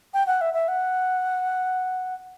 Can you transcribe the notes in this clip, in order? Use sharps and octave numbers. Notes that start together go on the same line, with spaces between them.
G5
F#5
E5
E5
F#5